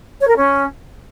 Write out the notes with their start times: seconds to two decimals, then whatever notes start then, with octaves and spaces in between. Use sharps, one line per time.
0.20 C#5
0.27 A#4
0.35 C#4